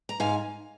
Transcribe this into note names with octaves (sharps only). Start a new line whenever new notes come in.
A#5
G#2 F5 G#5